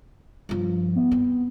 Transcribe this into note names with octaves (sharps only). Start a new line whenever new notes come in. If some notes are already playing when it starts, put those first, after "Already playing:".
G2 F3
B3
C4